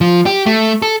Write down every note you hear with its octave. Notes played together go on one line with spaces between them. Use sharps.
F3
G4
A3
A4